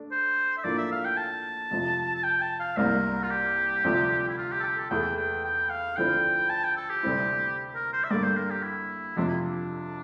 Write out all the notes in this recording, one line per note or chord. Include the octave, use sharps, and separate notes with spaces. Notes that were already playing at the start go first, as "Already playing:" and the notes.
Already playing: A3 D4
C5
E5
A2 F3 A#3 D4 D5
E5
F5
G5
A5
F2 C3 F3
A5
G5
A5
F5
C2 C3 G3 A#3 A#4
F4
G4
D2 C3 F3
E4
F4
G4
A4
G4
A4
E2 E3 A3 G5
G5
G5
F5
D2 D3 F3 C4 E4 G5
A5
G5
A4
G4
D2 C3 G3 C4 E4
A#4
C5
E5
G2 D3 G3 A#3 D5
C5
A#4
G4
E4
F2 C3 F3 D4
E4
D4